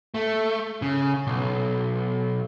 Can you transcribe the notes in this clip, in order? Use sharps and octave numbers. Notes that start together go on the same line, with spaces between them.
A3
C#3
B1